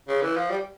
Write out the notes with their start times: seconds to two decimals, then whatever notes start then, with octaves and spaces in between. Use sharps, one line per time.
0.08 C#3
0.22 E3
0.36 F3
0.50 G3